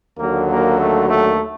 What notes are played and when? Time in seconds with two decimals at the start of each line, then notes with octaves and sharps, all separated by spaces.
0.18 D#2 D3 F#3 A#3
0.48 A#3
0.78 A3
1.08 A3